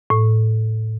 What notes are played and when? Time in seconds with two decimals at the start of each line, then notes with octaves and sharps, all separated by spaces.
0.10 A2